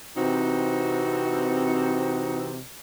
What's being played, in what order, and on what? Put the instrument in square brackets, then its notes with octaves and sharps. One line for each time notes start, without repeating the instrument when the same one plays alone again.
[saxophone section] C3 E3 C4 D#4 F#4